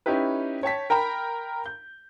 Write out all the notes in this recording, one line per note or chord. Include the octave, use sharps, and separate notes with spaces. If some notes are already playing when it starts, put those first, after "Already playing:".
C#4 D#4 E4 G4 B4
C#5 G5 A5 B6
A#4 G5 A#5 B5
G6